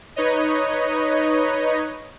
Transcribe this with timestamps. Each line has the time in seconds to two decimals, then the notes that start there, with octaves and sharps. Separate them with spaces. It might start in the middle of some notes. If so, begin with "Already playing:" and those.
0.16 D#4 B4 C#5 D#5